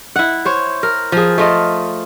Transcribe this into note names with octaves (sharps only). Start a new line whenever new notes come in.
E4 F#5
C5 C#5
A#4
F3 G#4
A3 F4 D#5